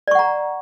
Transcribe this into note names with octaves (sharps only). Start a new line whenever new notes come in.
D5 F#5 A#5 C#6